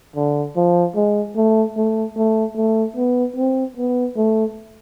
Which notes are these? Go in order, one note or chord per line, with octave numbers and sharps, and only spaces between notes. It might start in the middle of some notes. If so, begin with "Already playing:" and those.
D3
F3
G#3
A3
A3
A3
A3
B3
C4
B3
A3